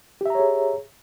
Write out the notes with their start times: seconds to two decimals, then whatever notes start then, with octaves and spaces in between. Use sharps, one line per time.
0.21 G4
0.26 E5
0.30 A#5
0.35 C#5
0.40 G#4